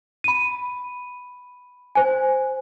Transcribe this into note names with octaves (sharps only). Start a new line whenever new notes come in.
B5 D#7
C5 G#5